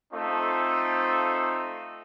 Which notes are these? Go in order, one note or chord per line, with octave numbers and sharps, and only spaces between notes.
A3 C4 D#4 F4 A4